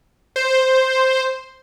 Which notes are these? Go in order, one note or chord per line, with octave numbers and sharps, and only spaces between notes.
C5